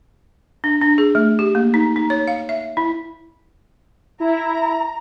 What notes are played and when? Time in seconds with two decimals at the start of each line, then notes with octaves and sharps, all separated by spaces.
0.64 D4
0.81 D4
0.98 G#4
1.15 A3
1.39 G4
1.55 A#3
1.74 D#4
1.96 D#4
2.10 C#5
2.27 F5
2.49 E5
2.77 E4
4.20 E4 A#5